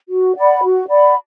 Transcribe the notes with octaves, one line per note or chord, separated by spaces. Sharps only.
F#4
D5 F#5 B5
F#4
D5 F#5 B5